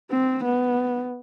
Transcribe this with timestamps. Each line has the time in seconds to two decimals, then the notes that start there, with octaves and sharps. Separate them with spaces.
0.11 C4
0.43 B3